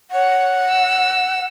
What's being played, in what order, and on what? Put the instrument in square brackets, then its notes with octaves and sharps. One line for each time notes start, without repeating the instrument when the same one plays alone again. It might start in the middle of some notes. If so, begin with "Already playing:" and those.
[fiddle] C#5 [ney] F#5
[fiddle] E6